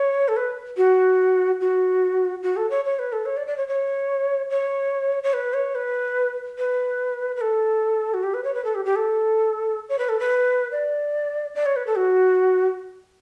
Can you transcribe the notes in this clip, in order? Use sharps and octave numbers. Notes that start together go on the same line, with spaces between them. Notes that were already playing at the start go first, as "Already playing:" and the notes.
Already playing: C#5
A4
B4
F#4
F#4
F#4
A4
C#5
C#5
B4
A4
C#5
D5
D5
C#5
C#5
C#5
C#5
B4
C#5
B4
B4
B4
A4
F#4
G4
B4
C#5
B4
A4
G4
G4
A4
C#5
B4
A4
B4
D5
D5
C#5
B4
A4
F#4